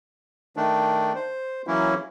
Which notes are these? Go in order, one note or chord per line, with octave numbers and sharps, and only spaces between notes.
D#3 A3 D4
C5
E3 F#3 A#3 C#4 E4